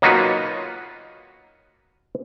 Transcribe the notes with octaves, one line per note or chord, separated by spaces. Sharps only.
F#3 A#3 D#4 F4 F#4 B4